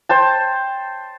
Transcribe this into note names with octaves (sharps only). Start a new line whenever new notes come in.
C5 G5 A5